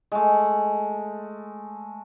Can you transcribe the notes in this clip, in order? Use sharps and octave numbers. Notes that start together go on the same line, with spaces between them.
G#3 A3